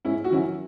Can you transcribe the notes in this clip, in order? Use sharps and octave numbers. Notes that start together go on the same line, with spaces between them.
G#2 C#4 E4
F#4
D#3 F#3 C#4 E4